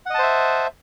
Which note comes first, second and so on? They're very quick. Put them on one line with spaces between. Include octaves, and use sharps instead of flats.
F#5 D#5 A5 C5 E5